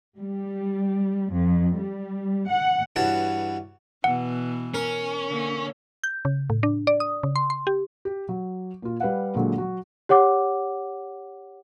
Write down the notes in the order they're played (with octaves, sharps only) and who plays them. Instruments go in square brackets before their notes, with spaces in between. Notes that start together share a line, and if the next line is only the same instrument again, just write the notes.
[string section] G3
F2
G3
F#5
[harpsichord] G2 E3 F#4 C#5 A5
[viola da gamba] B2 E3 [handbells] F#5
[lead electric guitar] C#4 [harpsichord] A#4
[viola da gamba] D3 A#3
[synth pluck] G6
C#3
A2
D4
D5
D#6
C#3
C6
C6
G4
[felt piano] G4
F#3
A#2 F4
G3 B4 F5 F#5
A#2 D3 F#3 G#3
F#3 F#4
[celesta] G4 C#5 F#5 D6